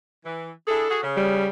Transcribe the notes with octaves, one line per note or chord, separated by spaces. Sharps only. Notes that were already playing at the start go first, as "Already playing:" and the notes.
E3
D4 E4 G#4 A4
F#4 G#4
C#3
G3